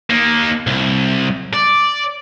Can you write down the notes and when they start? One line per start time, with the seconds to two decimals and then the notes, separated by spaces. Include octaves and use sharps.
0.10 A#3 D#4
0.67 C2
1.53 D5